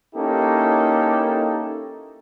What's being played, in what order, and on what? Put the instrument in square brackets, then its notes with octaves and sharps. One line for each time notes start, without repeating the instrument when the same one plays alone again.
[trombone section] A#3 C#4 D#4 E4 G4 A4